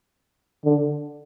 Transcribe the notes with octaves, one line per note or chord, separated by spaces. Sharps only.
D3